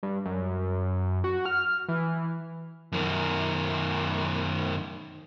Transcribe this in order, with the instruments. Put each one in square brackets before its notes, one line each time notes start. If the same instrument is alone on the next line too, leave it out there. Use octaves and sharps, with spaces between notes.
[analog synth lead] G2
F#2
F#4
F6
E3
[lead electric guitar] F#2 D#3